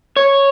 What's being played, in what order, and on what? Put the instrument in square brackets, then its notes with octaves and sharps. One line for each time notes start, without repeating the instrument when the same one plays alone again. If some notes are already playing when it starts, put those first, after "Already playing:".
[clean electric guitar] C#5